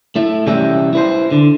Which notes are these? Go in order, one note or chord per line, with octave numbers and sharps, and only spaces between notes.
A3 E4
C3 E3 G3 C#4 G4 E5
E4 B4 C5
D3